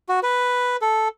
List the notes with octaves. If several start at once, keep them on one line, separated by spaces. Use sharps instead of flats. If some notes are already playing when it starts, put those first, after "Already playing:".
F#4
B4
A4